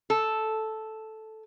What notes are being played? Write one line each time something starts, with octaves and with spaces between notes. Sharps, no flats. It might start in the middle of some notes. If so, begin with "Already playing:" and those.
A4